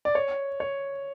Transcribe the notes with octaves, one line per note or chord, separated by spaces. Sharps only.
D5
C#5
C#5